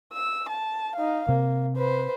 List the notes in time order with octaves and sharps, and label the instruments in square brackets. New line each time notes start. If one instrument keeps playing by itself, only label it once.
[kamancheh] E6
A5
D#4 F5
[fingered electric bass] C3 C4 [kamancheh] A#3
[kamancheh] B4 C5